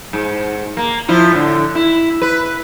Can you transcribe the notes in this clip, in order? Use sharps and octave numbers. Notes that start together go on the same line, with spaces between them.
G#2
A#3
F3 E4 F4
A2 D3
E4
B4